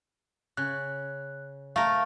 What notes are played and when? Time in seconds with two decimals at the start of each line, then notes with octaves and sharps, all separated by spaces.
0.57 C#3 F#6
1.76 A3 A#4 F5